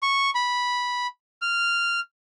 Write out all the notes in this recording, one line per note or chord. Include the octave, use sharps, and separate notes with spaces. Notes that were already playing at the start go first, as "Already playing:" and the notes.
C#6
B5
F6